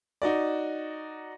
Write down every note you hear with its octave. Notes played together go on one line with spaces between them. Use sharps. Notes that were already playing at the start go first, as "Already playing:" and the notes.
D#4 F#4 D5